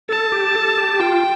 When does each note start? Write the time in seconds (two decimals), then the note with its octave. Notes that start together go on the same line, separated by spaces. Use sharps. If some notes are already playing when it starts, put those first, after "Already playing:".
0.09 A4 A5
0.32 G4
0.55 A4
0.77 G4
1.00 F4 G5